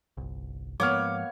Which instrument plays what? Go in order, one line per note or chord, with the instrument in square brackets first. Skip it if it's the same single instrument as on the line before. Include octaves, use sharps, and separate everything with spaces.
[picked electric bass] G1 C2
[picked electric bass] G#2 F3 G#3 [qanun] A#3 B3 [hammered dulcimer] C#5 [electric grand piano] D6 F6